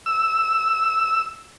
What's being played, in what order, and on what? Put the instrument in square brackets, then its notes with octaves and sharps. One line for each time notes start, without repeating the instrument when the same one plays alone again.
[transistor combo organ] E6